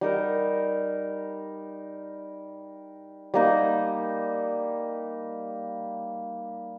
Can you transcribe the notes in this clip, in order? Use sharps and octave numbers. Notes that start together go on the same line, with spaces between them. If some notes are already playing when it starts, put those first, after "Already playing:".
G3 D#4 A#4
G3 A#3 D#4